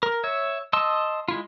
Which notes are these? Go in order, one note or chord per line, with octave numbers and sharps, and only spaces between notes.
A#4
C#5 E5
D#5 A5 C6 E6
G#3 E4 F4